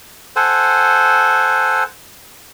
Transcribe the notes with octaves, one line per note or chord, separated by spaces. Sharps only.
A4 C5 F#5 G#5